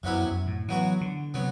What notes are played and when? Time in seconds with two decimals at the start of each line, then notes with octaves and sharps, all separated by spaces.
0.03 F#2 C3 F#3 B3 E4
0.25 F#2
0.47 A2
0.68 E3 F#3 B3 F#4
1.01 D3
1.34 C3 F#3 B3